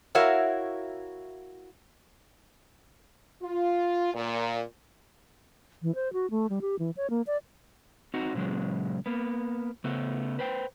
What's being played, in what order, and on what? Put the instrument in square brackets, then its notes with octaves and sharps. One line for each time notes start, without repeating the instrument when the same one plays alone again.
[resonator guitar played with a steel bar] E4 F#4 A#4 C#5 E5 F5
[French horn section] F4
A#2
[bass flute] E3
C5
F#4
A3
G3
G4
E3
C#5
A#3
D5
[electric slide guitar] C4 D#4 F#4
A#2 C#3 F#3 G#3
A#3 B3
C#3 A3 B3
B4 C5 G5